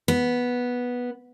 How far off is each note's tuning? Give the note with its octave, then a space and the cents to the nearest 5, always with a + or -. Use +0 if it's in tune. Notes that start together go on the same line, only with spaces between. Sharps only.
B3 -10